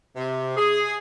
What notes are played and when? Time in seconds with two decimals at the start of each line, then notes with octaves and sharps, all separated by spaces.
0.16 C3
0.57 G#4